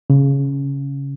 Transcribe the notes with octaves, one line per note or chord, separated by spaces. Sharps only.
C#3